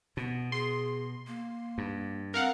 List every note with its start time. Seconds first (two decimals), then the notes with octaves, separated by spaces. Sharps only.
0.17 B2 B3
0.52 G#4 C6
1.27 A#3
1.78 G2
2.34 C4 A#4 F5 F#5